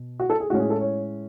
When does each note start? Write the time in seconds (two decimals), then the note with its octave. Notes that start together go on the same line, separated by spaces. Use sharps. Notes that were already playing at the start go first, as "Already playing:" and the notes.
Already playing: B2
0.20 F#4
0.30 A4
0.40 G#4
0.50 A2 G#3 C#4 F#4
0.59 G#4
0.70 A4
0.81 C#5